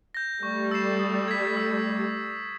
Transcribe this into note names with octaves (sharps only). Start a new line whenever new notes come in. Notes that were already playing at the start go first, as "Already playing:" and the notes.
G6 A#6
G3 A3 C#6
E6 A6 C7 E7
D#6
G#6 B6
E6